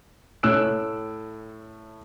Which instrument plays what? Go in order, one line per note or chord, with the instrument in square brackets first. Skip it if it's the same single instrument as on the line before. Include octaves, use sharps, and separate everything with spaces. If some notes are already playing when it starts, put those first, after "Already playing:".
[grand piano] A2 C#5 E6 F#6 D7